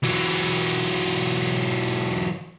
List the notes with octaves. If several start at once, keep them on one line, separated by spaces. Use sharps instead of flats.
E3 F#3